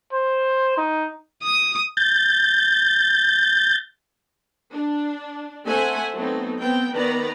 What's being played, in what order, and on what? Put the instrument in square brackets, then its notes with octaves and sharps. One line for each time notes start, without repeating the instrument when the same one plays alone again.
[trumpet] C5
D#4
[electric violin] D#6
[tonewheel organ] G6 A6
[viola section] D4
A3 C4 C5 E5 F#5 G#5
F#3 A3 B3 C4 D#4
B3 C4 G5
D#3 B3 B4 D5 A#5